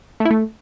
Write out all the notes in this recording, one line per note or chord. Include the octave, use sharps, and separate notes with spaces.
A3
E4
A3